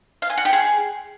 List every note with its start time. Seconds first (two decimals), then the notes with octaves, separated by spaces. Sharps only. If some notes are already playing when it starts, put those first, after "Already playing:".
0.22 F5
0.30 G#5
0.37 F#4
0.45 G4
0.53 G#4